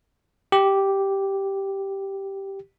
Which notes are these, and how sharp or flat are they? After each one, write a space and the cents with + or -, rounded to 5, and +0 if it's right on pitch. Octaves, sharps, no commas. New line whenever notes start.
G4 -5